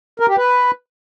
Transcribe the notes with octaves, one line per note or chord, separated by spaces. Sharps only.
A#4
G4
B4